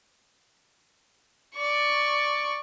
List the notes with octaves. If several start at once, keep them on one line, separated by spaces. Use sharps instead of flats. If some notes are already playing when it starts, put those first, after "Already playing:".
D5 C#6